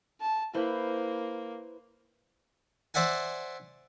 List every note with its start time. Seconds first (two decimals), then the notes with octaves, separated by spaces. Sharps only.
0.21 A5
0.54 A#3 E4 B4 C5
2.94 C5 D5 E5 F#5 G#5